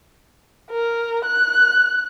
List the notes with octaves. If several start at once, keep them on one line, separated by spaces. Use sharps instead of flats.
A#4
F#6